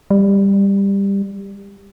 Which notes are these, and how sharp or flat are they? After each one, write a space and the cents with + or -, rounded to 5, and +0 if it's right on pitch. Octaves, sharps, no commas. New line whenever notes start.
G3 +15